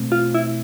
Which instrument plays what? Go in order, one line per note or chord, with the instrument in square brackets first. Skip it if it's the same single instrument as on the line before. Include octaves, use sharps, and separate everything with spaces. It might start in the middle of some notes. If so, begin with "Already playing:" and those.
Already playing: [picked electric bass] B2 A3 C4
[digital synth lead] F4
E4